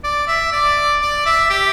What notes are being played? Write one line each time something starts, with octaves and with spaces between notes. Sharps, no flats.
D5
E5
D5
D5
E5
G4